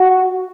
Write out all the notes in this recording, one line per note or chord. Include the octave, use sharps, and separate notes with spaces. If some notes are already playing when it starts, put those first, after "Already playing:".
Already playing: F#4